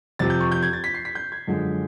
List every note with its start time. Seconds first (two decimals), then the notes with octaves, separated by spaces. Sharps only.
0.19 F2 C3 F3 A6
0.30 G6
0.40 C#6
0.52 G6
0.62 G#6
0.73 A6
0.84 B6
0.94 C7
1.05 B6
1.15 G6
1.32 G#6
1.48 F#2 D3 F3 G#3